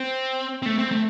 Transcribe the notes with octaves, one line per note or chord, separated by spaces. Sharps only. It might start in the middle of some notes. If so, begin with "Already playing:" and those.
Already playing: C4
C4
A3
C4
A3